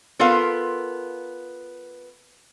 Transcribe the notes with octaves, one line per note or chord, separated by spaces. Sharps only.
B3 F4 A4 A#4 F5